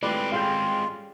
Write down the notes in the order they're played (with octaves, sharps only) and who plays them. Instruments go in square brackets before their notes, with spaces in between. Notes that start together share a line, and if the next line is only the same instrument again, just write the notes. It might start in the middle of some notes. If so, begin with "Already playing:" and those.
[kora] A2 G3 F4 [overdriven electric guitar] G#3 C4 [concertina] B4 [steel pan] D5
[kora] G3 C#4 G#4 [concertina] F4 [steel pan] F5 G5